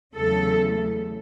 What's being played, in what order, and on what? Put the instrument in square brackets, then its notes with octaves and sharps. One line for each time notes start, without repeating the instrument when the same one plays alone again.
[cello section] E2 C#3 F#3 A3 A4